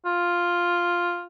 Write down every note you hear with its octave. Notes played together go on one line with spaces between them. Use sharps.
F4